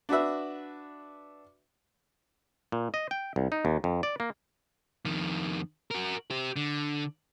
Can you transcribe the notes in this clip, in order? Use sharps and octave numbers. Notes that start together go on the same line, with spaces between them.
D4 F#4 B4 E5
A#2
D#5
G5
C2
D#4
D#2
F2
D5
A#3
F2 D#3
F#4 A#4
G4 C5
D3